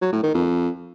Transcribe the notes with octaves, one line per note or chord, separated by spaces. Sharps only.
F#3
A2
D#3
F2